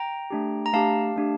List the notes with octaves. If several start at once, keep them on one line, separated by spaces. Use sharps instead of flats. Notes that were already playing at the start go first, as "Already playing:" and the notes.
Already playing: G5 A#5
A3 D4 G4
A#5
A3 D4 G4 F5 A5
A3 D4 G4